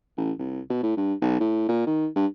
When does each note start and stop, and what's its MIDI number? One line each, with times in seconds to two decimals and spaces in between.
0.17 0.32 33
0.39 0.60 36
0.70 0.82 47
0.83 0.94 45
0.97 1.14 43
1.22 1.38 35
1.40 1.68 45
1.68 1.85 46
1.86 2.08 51
2.15 2.26 43